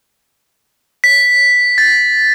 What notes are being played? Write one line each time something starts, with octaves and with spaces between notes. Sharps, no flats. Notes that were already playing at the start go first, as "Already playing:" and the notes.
B6
A6